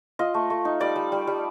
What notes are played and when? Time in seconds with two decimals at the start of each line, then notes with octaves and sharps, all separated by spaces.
0.19 F4 D#5
0.34 A3
0.50 A3
0.65 D#4
0.80 G3 D5
0.96 G3
1.12 G3
1.27 G3